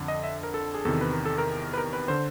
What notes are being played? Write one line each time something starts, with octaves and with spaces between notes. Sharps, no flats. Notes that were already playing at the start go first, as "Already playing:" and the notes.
Already playing: F2 D3
D#5
E5
A#4
A4
G#4
E2 C3 D#3 A4
B4
A#4
A4
A#4
B4
A#4
B4
D3 C5